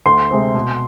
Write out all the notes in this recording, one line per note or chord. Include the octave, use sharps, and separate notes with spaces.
D2 C6
C3 G#3 C4
B2